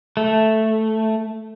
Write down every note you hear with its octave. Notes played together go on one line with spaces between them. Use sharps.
A3